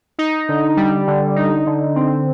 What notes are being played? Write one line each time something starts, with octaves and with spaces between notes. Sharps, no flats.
D#4
D3
G3
D3
D#4
D3
C4